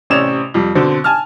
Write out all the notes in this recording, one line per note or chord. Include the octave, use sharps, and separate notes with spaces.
A1 C3 C#4 D5 E7 F7
F2 G3
B2 D3 C4
G#5 A5 F6